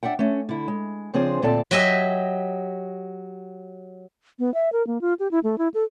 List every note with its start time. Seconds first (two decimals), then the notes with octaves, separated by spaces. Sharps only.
0.03 D4 E5 F#5 G5
0.19 A3 C#4
0.49 D3 E4
0.68 G#3
1.14 C#3 F3 C4 D4 G#4 C5
1.42 D2 A#2 C4 A4 D5 A5
1.71 F#3 G4 D#5 E5 G#5
4.39 B3
4.54 E5
4.72 A#4
4.87 A#3
5.01 F4
5.20 G4
5.31 E4
5.44 A3
5.58 E4
5.74 A4